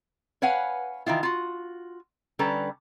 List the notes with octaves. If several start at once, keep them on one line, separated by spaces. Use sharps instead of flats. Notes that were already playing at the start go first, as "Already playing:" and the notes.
B4 C#5 F5 F#5 G#5
D#3 E3 E4 F4
F4 F#4
D3 G3 C#4 A4 B4 A#5